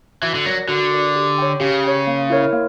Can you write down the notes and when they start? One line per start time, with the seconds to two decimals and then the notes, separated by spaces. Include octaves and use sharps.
0.22 E3 F#4
0.35 D3
0.46 F#3 A#4 D5
0.68 D3 F#4
0.91 A#4 D5
1.15 G4
1.38 C#5 G5
1.60 C#3 G4
1.84 C#5 G5
2.07 A#3
2.30 E4 A#4 C#5
2.53 A#3